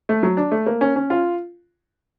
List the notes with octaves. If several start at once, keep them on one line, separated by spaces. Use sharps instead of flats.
A3
F#3
D4
A3
A#3
C#4
C#4
F4